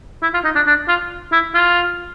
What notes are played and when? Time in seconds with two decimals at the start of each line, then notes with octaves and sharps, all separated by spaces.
0.22 E4
0.34 F4
0.44 D#4
0.55 D4
0.66 D4
0.88 F4
1.32 E4
1.54 F4